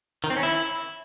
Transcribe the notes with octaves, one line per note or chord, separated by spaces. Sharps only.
D#3
C4
C#4
E4